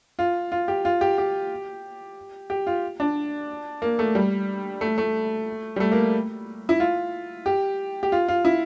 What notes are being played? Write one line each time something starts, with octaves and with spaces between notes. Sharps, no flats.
F4
F4
G4
F4
G4
G4
G4
F4
D4
A#3
A3
G3
A3
A3
G3
A3
A#3
E4
F4
G4
G4
F4
F4
E4